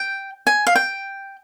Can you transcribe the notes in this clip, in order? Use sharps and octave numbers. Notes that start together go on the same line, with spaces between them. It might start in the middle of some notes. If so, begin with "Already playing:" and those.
Already playing: G5
G#5
F5
G5